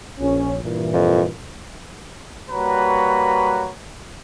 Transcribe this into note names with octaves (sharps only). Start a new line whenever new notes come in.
A#1 C#4
G2 A#2 E3
F2
G3 A#3 F#4 B4 C#5 A#5